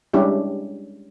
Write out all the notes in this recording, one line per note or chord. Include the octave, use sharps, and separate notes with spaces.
G3 G#3 C#4 D4 E4 G4